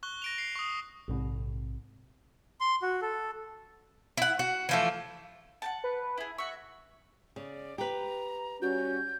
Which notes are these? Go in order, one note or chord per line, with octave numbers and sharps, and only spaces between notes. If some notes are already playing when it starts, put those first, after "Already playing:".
C#6 F#6 G7
A#6 D7 F7
C7
C#6 D#6
A#1 G#2 C3
C6
F#4
A4
E4 F#5
F#4
E3 F3 A3
F#5 G5 A5
B4
E4 G#4
F#4 E5 C#6
C#3 D5
G4 B4 A#5
G3 C#4 F#4 G6